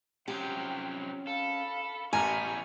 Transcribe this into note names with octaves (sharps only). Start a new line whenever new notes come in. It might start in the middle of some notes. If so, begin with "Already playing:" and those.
C3 F3 F#3 C#4 G4 G5
A4 F5 B5
A1 E3 G3 B3 G#5 A#5 C#6 F6